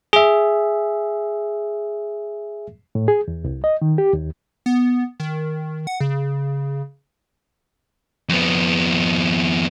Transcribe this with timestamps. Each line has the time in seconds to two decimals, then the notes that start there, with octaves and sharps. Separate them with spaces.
0.13 G#4 E5
2.95 A2
3.08 G#4
3.28 E2
3.44 C2
3.64 D#5
3.82 D#3
3.98 G4
4.13 D#2
4.66 B3
5.20 D#3
5.87 F#5
6.01 C#3
8.29 F2 B3